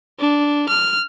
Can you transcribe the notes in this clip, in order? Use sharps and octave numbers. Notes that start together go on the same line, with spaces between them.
D4
F6